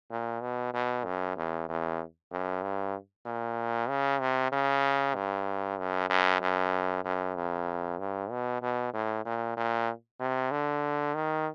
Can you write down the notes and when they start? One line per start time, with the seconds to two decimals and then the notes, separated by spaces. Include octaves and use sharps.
0.11 A#2
0.42 B2
0.74 B2
1.05 F#2
1.37 E2
1.68 E2
2.31 F#2
2.62 G2
3.26 A#2
3.89 C#3
4.20 C3
4.52 C#3
5.15 G2
5.78 F#2
6.10 F#2
6.41 F#2
7.04 F#2
7.35 F2
7.99 G2
8.30 B2
8.62 B2
8.94 A2
9.25 A#2
9.57 A#2
10.20 C3
10.51 D3
11.15 D#3